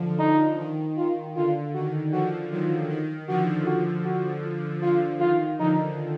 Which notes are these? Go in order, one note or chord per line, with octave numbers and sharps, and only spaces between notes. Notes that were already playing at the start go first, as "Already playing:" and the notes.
Already playing: D3 F3
D#4
D#3
D#3 F4
D3 F4
D#3 F#4
D3 F3 F#4
D#3 F#3 F4
D#3
D3 F3 F#4
F#4
F#4
D3 F3 F4
D#3 F4
D3 F3 D#4